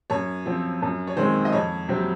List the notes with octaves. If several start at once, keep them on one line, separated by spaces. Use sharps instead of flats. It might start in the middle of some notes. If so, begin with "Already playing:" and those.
F#2 C#5
F3 C4
F#2
C#5
D#3 G#3 C4 C5
D#5
F2 C#5
C3 F#3 C4